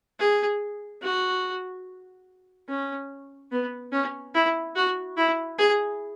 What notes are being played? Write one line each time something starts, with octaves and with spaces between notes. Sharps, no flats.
G#4
F#4
C#4
B3
C#4
E4
F#4
E4
G#4